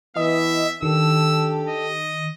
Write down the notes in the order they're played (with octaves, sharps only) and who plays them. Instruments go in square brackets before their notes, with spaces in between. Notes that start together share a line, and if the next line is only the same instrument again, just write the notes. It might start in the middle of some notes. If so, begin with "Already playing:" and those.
[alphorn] E3 [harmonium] B3 [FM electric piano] D#5 [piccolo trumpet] E5
[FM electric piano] D#3 [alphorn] D4 [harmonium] G4 A4 [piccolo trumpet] E6
[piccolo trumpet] D#5